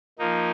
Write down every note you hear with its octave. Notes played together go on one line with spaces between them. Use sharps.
F3 A#3 D#4